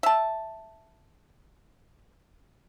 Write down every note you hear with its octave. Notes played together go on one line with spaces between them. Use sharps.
E5 A5